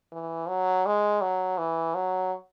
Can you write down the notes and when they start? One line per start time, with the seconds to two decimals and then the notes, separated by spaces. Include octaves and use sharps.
0.12 E3
0.49 F#3
0.86 G#3
1.21 F#3
1.58 E3
1.95 F#3